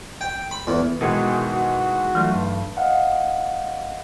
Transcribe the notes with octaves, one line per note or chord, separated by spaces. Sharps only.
G5
B5
E2
B2 D#3 E3 G#3 F#4 G#4
G5
F#4
E3 F#3 A3 F4
G2
D#5 F5 F#5